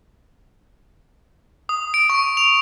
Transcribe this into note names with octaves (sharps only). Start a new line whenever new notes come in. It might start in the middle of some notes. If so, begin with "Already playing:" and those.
D#6
D7
C#6
F7